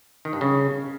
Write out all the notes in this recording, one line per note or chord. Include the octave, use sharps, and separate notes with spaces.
D#3
G2
C#3